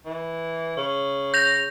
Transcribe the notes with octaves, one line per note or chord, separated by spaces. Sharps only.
E3
C#3
G6 A#6 F7